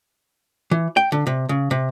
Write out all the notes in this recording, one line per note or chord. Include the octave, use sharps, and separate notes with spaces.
E3
G5
D3
C3
C#3
C3